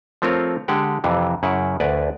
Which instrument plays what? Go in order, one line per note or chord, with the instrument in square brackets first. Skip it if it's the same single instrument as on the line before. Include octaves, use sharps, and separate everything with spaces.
[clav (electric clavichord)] F3 A3 C4 F4 A#4 C#5
D3 G#3 G4 F#5 G5
F2 C3 E3
F#2 C#3 E4 F#5
D2 B4 D5 G#5